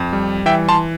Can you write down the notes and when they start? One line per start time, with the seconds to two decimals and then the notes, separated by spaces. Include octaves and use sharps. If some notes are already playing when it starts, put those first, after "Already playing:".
Already playing: F2
0.13 G3
0.46 E3 E5 G5
0.69 A5 C6